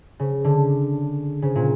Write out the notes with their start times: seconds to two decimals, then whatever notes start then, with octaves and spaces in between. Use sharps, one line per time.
0.19 C#3
0.44 D3
1.42 C#3
1.55 A#2